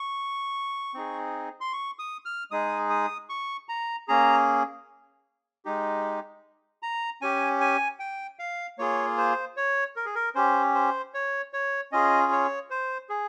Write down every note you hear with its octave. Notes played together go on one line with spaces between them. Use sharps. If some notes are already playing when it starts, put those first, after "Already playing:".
Already playing: C#6
C4 D#4 G#4
C6
C#6
D#6
F6
G#3 D#4 G#4 D#6
D#6
C#6
A#5
A#3 C#4 G#4 A#5
G#3 D#4 G4
A#5
C#4 G4 G#5
G#5
G5
F5
A#3 F4 G#4 C#5
C5
C#5
A#4
G#4
A#4
C#4 G4 C5
C5
C#5
C#5
C#4 F4 G#4 D#5
C#5
C5
G#4